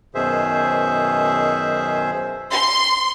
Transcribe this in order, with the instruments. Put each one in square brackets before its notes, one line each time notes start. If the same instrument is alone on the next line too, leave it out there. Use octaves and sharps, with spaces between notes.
[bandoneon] F#2 B2 D#3 G#4 C5 E5
[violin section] C6